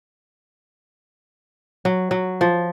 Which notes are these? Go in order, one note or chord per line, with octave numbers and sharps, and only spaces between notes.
F#3
F#3
F3